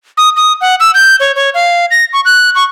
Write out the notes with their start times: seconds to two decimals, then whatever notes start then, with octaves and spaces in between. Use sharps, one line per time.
0.17 D#6
0.37 D#6
0.61 F#5
0.80 E6
0.94 G6
1.20 C#5
1.36 C#5
1.54 F5
1.91 A#6
2.13 C#6
2.25 F#6
2.55 C#6